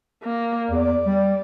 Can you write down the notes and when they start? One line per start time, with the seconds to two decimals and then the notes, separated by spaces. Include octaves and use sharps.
0.24 A#3
0.71 E2 D5
1.06 G3